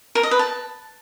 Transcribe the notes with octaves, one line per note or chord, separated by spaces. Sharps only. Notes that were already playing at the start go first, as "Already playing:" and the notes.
A#4
D#5
B4
A5